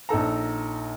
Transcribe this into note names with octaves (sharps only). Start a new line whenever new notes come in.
A#1 D#4 A4 A#5